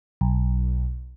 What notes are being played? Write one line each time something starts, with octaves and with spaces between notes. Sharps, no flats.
B1